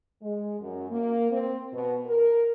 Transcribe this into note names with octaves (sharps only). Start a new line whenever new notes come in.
G#3
F#2
A#3
C4
B2
A#4